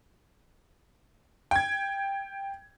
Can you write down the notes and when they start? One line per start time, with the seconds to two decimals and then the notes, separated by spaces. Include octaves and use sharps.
1.51 G5 G#6